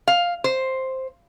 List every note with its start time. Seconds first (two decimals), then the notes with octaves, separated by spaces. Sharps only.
0.08 F5
0.44 C5